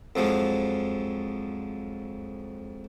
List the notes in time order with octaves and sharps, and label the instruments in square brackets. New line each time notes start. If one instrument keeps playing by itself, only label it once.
[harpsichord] F2 F3 F#3 G#3